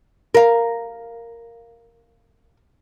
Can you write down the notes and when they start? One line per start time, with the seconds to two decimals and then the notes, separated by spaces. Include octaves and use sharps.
0.35 A#4 F5